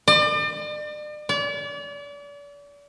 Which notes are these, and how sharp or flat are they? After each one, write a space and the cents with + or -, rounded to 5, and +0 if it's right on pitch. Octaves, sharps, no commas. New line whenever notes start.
D5 +40
D5 -40